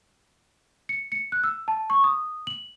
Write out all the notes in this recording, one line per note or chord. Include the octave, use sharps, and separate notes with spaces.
C#7
C#7
F#6
E6
A5
C#6
D#6
F#7